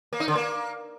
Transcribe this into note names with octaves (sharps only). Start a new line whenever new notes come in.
A#3
D#4
D3
A#3